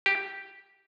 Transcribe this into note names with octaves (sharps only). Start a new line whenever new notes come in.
G4